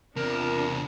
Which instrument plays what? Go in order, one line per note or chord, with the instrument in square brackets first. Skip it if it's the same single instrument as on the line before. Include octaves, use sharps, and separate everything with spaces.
[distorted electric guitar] E2 A5 [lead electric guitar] C3 [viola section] D4 F4 [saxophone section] A#4